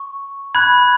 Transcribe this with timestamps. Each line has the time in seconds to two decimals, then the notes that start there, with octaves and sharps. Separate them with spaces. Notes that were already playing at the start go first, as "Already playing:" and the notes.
Already playing: C#6
0.55 B5 F#6 G#6